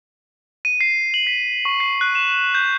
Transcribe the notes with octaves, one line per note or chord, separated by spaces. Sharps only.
D#7
C7
F#7
B6
C#6
C7
F#6
E7
G6